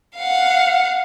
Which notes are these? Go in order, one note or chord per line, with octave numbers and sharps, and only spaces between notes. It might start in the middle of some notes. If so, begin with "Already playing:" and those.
F5 F#5